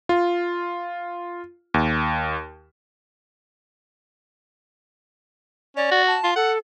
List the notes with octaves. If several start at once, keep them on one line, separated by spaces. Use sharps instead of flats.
F4
D#2
C#4 D5
F#4
A5
F4
A4 F#5